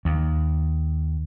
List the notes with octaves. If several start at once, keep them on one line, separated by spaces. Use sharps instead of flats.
D#2